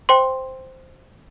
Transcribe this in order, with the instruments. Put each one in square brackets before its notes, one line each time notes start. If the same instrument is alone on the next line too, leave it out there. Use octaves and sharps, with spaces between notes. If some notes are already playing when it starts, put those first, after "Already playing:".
[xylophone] C5 G5 C6